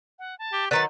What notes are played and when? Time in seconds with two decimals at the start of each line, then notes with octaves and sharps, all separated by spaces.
0.19 F#5
0.39 A5
0.53 G4
0.71 D3 D#3 F#3 B4 A6